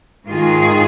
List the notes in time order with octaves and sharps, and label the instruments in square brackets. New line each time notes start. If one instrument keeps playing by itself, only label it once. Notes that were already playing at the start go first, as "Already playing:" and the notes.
[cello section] G#2 D#3 G#3 F4 G#4